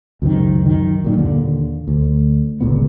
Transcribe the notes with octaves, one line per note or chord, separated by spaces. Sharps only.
C#2 F#2 C3 D#3
F#2 D#3
F#2 A#2 D#3
D#2 A#2 D3
D2
G1 C#2 A#2 B3